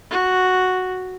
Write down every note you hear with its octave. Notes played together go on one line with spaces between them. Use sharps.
F#4